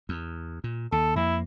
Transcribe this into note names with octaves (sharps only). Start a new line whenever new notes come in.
E2
A#2
D#2 A4
F2 A#3 E4